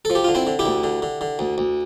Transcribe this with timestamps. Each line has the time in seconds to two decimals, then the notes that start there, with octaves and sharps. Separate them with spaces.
0.05 F3 A4
0.15 G4
0.24 D3 F4
0.35 C4 E4
0.47 D3
0.59 E4 G4
0.66 D2
0.84 D3
1.02 D3
1.21 D3
1.39 D2
1.58 D2